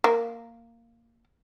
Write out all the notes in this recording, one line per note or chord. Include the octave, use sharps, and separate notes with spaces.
A#3